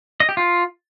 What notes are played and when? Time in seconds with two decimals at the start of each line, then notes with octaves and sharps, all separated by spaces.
0.20 D#5
0.29 G4
0.37 F4